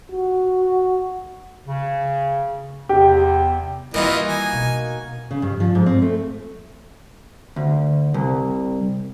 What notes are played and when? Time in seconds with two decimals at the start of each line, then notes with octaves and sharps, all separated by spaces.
0.12 F#4
1.67 C#3
2.89 E2 C3 G4
3.94 D#3 E3 G3 A#3 D#4 F4 F#4 D#5
4.27 G#5
4.52 B2
5.31 C#3
5.42 G2
5.60 F3
5.75 G#2
5.86 C4
6.02 A3
7.56 D2
8.14 C2